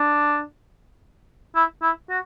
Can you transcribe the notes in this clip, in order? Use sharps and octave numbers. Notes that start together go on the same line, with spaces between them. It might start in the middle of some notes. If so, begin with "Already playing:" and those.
Already playing: D4
E4
E4
F#4